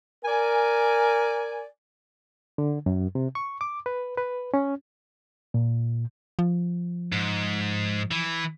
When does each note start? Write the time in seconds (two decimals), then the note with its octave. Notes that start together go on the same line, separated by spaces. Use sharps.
0.25 A#4 D5 G#5
2.58 D3
2.86 F#2
3.15 C3
3.35 C#6
3.61 D6
3.86 B4
4.17 B4
4.54 C#4
5.54 A#2
6.39 F3
7.12 G#2
8.11 E3